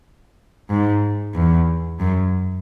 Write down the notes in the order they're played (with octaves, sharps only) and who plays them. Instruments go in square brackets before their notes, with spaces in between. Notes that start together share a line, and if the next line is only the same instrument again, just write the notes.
[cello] G#2
E2
F#2